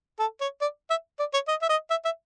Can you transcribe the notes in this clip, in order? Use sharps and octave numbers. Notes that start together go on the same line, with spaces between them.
A4
C#5
D5
E5
D5
C#5
D#5
E5
D#5
E5
E5